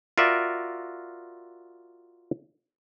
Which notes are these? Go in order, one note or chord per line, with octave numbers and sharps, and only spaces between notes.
F4 F#4 A#4 D5 E5